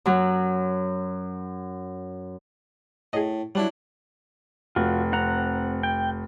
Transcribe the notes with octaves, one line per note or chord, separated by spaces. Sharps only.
F#2 F#3
A2 G#4 D#5
F#3 G3 D4 E4
F1 F4 F#4
C4 F#5 A#5
G5